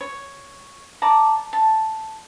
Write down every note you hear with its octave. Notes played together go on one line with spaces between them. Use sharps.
C#5
D5 A5 A#5
A5